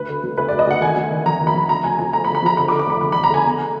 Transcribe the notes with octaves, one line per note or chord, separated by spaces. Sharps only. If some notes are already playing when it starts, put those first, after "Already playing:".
Already playing: D2 B4
D3
F#3
D2 B4
D2 D5
D#5
D2 F#5
D#3 G#5
F#3
D#3
F2 A#5
D#3
B5
F2
D2 A#5
D2 G#5
F3 G#5
D3 A#5
B5
D3
B5
F3 A#5
D3 B5
D6
D3
D6
F1 B5
D3 D6
F1 B5
A#5
D3 G#5
B3